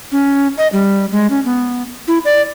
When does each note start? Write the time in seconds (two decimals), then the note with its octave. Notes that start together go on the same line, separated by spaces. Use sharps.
0.12 C#4
0.58 D#5
0.73 G3
1.11 G#3
1.30 C#4
1.45 B3
2.08 E4
2.25 D5